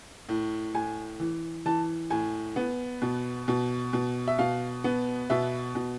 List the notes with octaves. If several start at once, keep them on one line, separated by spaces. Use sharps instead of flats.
A2
A2 G#5
E3
E3 A5
A2 G#5
B3
B2
B2
B2
E5
B2 F5
B3
B2 E5
B2